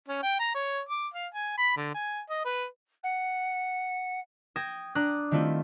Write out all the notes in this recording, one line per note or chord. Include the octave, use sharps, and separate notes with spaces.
C#4
G5
A#5
C#5
D6
F5
G#5
B5
D3
G#5
D#5
B4
F#5
G5 D#6 G#6 A#6 E7
D4 A#5 D6 D#6 F#6
D#3 G3 A3 C4 E4 F4